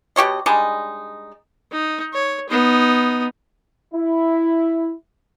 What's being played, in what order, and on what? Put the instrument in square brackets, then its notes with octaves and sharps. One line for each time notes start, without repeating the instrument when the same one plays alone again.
[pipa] B2 G4 C#5 D#5
G3 G#3 D4 D#4
[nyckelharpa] D#4
C#5
B3 D#4
[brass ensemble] E4